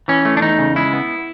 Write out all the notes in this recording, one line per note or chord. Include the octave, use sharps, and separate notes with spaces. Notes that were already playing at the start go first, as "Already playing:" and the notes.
E3 C#4
A3
D4
E2 D#4
C#3
G#3 E4
B3